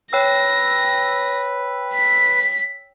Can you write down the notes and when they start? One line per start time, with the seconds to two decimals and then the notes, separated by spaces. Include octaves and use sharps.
0.13 B4 C#5 G5 E6 A#6
1.94 B6